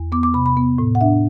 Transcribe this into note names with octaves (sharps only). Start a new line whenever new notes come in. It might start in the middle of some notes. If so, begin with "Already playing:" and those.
Already playing: E2
B3 D6
D6
C3 B5
B5
B3
A2
F#5
D4 E5